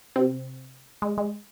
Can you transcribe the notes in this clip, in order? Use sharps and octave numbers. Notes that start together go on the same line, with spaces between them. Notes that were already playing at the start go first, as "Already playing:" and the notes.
C3 C4
G#3
G#3